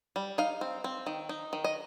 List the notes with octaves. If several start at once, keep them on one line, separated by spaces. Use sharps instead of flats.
G3
D#4 F5
C4
C4
D#3
D#4
D#3
D#5